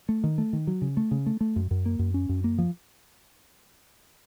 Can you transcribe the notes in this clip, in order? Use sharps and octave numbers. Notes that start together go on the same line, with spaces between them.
A3
D#3
A3
D#3
F#3
C#3
A3
C#3
A3
A3
F#2
F#2
A#3
F#2
C#4
F#2
A#3
F3